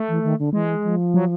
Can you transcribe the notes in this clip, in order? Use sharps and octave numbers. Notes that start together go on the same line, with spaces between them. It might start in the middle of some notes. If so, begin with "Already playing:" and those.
Already playing: A3
E3
D#3
D3
E3 G#3
F3
F#3